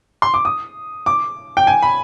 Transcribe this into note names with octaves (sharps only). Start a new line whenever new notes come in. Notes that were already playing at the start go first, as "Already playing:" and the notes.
C6
D6
D#6
D6
G5
G#5
B5